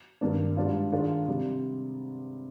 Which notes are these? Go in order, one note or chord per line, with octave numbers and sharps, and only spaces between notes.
G2 D#3 A#3 D4
G#2 G3 D4 F4
G#2 D#3 G#3 D4 F4
C3 G3